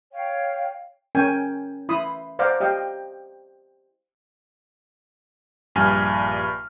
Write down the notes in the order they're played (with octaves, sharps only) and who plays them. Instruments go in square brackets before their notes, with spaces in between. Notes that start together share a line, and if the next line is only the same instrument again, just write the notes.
[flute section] C#5 F5 G5
[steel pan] C#4 A#4 G5 G#5
E4 B5 C6 D#6
C5 D5 F5 F#5 A#5 D6
G4 D#5 F5 G5
[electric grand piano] A#1 G2 G#5 F6